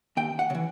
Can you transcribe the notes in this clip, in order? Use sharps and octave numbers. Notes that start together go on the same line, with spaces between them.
D#2 G5
F#5
C#3
E3